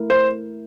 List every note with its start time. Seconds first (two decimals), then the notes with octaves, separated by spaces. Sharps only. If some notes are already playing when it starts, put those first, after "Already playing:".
Already playing: A3 E4 A#4
0.10 C5